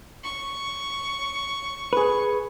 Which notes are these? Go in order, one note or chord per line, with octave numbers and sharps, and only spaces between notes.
C#6
G#4 B4